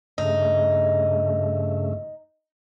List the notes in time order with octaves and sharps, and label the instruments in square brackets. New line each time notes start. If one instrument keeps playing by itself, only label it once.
[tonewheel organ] G2 C#3 A3 [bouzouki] D#4